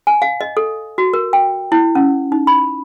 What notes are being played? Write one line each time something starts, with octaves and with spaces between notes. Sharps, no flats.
G#5
F5
D#5
A4
F#4
A#4
G5
E4
C#4
D#4
B5